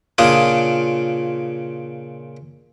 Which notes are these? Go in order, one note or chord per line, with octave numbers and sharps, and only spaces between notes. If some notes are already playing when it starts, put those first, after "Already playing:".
A#2 C#3 D4 F4 D#6